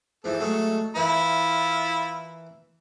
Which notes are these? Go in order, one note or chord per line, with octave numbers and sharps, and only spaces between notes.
G#2 E3 F3 A4
F#3 G#3 A3
E3 E4 F4 A#4